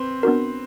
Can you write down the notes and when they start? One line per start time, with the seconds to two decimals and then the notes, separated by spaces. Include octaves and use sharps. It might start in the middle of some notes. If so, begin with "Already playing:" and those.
Already playing: C4 B4
0.23 B3 D4 F#4 A#4